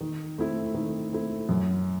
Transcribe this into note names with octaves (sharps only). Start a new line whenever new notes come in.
D#3
A3 C4 E4
D#3
A3 C4 E4
F#2